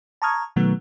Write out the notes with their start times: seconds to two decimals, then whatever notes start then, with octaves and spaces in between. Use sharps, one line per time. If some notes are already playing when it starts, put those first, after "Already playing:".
0.22 A5 A#5 C#6 D#6 F6 G#6
0.56 B2 D#3 F#3 A3 B3